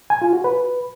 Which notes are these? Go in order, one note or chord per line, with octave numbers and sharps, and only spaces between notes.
G#5
F4
F#4
B4